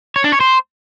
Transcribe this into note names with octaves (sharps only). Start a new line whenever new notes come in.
C#5
D4
C#5
C5